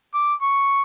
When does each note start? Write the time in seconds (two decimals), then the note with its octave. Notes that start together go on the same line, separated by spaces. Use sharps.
0.14 D6
0.42 C#6